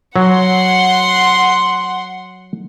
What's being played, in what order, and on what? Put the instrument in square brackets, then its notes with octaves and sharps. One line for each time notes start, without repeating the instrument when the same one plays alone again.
[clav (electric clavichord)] F#3 [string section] F#5 C6